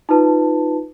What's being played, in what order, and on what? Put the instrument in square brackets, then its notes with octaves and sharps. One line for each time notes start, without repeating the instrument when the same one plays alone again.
[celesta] D#4 F4 B4 A5